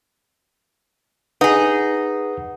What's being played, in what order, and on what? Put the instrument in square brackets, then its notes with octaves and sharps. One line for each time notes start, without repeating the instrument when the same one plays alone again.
[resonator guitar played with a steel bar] D#4 G#4 [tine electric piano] B4 F#5 D#6